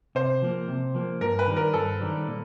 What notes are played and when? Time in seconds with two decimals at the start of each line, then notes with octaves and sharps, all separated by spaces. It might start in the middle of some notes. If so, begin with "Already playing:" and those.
0.15 C3 C5
0.42 F3 A#3
0.68 C3
0.94 F3 A#3
1.21 G2 A#4
1.39 B4
1.47 D#3 G3
1.56 A#4
1.74 G2 A4
2.01 D#3 G3
2.27 A#2